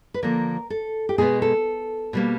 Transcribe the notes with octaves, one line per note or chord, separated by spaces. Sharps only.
B4
D3 F3 A#3 A#4
A4
G4
B2 G#3 B3 G#4
A4
B2 G3 A#3